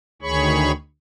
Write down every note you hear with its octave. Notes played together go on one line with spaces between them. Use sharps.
D2 D#3 G#4 C#5 B5 C#6